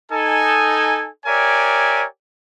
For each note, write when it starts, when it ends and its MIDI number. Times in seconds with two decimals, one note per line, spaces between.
0.11 1.08 63
0.11 1.08 69
0.11 1.08 80
1.25 2.05 67
1.25 2.05 70
1.25 2.05 73
1.25 2.05 74
1.25 2.05 76
1.25 2.05 80